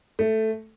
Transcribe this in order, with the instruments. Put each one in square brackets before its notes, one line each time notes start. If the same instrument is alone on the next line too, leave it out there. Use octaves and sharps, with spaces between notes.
[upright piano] A3